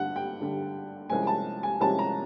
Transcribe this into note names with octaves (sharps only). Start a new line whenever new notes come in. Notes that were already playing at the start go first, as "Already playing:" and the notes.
Already playing: G2 D3 G3 F#5
G5
G2 D3 G3
C2 C3 F3 G#3 C#4 G#5
A5
G#5
C2 C3 F3 G#3 C#4 A5
A#5